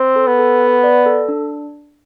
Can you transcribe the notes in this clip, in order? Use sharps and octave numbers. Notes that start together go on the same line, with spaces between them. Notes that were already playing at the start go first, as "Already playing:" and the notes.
Already playing: C4
A4
B3
A4
F#5
D5
A4
D4